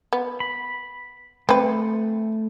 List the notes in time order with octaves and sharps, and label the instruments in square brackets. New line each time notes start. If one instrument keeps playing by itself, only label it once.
[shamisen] B3
[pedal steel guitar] B5
[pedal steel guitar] A3 [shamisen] C4 B4